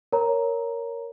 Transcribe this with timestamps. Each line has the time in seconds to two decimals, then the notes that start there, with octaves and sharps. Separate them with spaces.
0.12 A#4 C#5 A#5